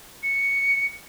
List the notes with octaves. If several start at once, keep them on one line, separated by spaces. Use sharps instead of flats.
C#7